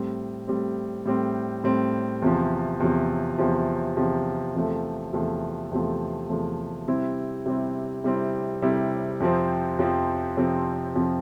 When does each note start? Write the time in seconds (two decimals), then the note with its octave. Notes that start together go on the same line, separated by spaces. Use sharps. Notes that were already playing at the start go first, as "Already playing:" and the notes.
Already playing: A2 G3 C4
0.47 A2 G3 C4
1.05 A2 G3 C4
1.64 A2 G3 C4
2.22 E2 C3 F3
2.80 E2 C3 F3
3.38 E2 C3 F3
3.97 E2 C3 F3
4.55 E2 C3 F3 A3
5.13 E2 C3 F3 A3
5.71 E2 C3 F3 A3
6.29 E2 C3 F3 A3
6.88 C3 G3 C4 E4
7.46 C3 G3 C4 E4
8.04 C3 G3 C4 E4
8.62 C3 G3 C4 E4
9.20 F2 C3 F3 C4
9.79 F2 C3 F3 C4
10.37 F2 C3 F3 C4
10.95 F2 C3 F3 C4